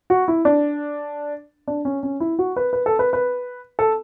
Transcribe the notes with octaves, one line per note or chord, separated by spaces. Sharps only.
F#4
E4
D4
D4
C#4
C#4
E4
F#4
B4
B4
A4
B4
B4
A4